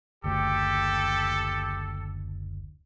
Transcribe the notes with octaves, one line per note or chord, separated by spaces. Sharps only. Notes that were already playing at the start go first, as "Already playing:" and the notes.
F#1 D2 G4 A4